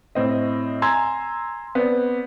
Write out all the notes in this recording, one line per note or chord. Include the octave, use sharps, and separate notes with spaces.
A2 C4 D#5
G#5 A#5 C6 E6 G#6
B3 C4 D5